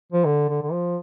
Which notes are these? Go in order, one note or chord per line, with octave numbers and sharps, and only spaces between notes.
F3
D3
D3
D3
F3